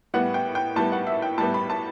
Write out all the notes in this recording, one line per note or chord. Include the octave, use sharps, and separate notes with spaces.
A2 G3 B3 F#5
G5
G5
A2 G3 B3 A5
F#5
E5
G5
A2 G3 B3 A5
B5
A5